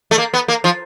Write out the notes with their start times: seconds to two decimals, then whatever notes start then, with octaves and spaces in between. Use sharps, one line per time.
0.11 A3
0.18 A#3
0.34 B3
0.48 A#3
0.64 F3